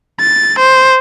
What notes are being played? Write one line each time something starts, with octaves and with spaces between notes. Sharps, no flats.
A6
C5